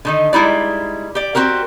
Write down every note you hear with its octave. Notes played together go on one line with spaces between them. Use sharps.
D3 D#3 D#4
G3 G#3 D#4 E4 D5
G4 D5
C4 F#4 G4 A#4